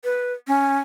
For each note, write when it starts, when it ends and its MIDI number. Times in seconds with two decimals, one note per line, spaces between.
0.04 0.33 71
0.48 0.78 61